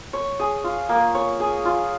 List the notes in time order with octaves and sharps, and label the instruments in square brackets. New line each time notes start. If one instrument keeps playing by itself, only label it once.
[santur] C#5
G#4
F4
A#3
C#5
G#4
F4